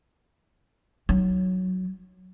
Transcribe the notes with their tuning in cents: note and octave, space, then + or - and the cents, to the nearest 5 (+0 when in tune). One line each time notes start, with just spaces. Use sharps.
F#3 +0 D#4 +0